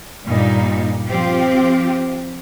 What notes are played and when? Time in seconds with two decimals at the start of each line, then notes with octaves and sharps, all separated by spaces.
0.24 G2 A#2 G3 D#4
1.07 F3 C4 F4 G4